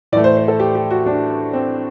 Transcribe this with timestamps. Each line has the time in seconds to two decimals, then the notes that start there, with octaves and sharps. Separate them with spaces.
0.12 A2 E3 A3 D5
0.24 C5
0.37 C5
0.48 A4
0.60 G4
0.75 G4
0.90 F#4
1.06 D4
1.53 C4